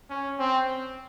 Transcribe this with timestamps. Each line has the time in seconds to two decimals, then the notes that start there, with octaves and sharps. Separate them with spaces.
0.10 C#4
0.39 C4